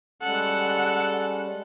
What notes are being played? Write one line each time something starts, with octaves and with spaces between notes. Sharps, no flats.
G3 G#3 C#4 A4 F#5